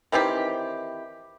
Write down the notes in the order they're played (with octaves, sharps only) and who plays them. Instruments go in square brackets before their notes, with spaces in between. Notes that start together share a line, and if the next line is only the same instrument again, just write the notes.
[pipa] D#3 E3 C4 G4